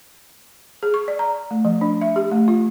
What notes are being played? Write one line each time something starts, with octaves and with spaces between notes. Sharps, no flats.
G#4
C#6
D5
A#5
A3
F3
D4
E5
G4
A3
F4